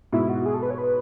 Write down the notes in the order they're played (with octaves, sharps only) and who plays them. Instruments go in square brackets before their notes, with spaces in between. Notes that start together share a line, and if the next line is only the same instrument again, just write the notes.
[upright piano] G#2 B2 [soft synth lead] E4
[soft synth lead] F#4
G#4
A4
B4
C#5
B4